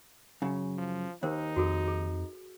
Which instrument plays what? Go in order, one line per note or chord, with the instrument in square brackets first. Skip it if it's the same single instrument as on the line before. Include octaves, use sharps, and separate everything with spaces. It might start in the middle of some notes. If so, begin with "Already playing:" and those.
[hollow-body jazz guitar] F#2 C#3
[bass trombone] F3
[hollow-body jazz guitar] D#2 [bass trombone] D#4 [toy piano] A#4 C5
[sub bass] F2 [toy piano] F#4 G#4 A4
[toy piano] G#4